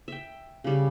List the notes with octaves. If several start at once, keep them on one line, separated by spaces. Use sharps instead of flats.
E5 G5
C#3 G3